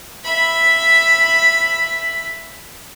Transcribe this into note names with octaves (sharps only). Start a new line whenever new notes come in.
E5 B5